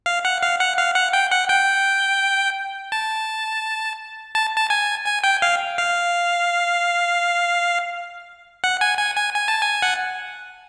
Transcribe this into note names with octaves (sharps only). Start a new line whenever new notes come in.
F5
F#5
F5
F#5
F5
F#5
G5
F#5
G5
A5
A5
A5
G#5
G#5
G5
F5
F5
F#5
G#5
G#5
G#5
G#5
A5
G#5
F#5